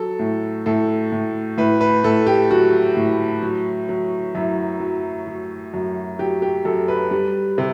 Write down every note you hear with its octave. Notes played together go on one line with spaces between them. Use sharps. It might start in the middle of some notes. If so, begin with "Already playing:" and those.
Already playing: F#3 A4
A2
A2 A4
A2
A2 B4
B4
A2 A4
G4
F#3 F#4
A2
F#3
F#3
F#2 E4
F#3
F#3
F#2
F#3 G4
G4
F#2 A4
B4
G3
C3